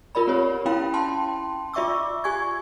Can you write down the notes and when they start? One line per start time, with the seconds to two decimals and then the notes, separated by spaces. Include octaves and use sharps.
0.15 F4 A#4 D5 B5
0.27 C4 G4 C#5
0.66 C#4 E4 F5 G5 B5
0.94 G5 A5 C6
1.74 F4 D5 E5 C#6 D6 E6
2.24 G4 G#5 C#6 G#6